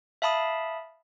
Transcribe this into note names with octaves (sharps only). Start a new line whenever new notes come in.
E5 F5 A5 B5 D#6